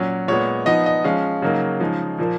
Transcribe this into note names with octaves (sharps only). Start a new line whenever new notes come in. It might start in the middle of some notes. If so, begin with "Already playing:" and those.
Already playing: A#2 F#3 C#4
A#2 G#3 B3 C#5
F3 B3 D#4 D#5
D#5
F3 G#3 C#4 F5
C#3 F#3 A#3 D#4
C#3 F3 G#3 D#4
A#2 F3 A#3